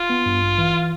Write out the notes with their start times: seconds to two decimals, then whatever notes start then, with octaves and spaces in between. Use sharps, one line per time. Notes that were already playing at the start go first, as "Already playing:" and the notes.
Already playing: F4
0.10 B3
0.26 G2
0.42 A1
0.58 E3